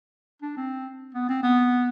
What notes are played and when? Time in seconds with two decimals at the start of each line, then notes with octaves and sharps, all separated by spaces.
0.42 D4
0.57 C4
1.15 B3
1.29 C4
1.43 B3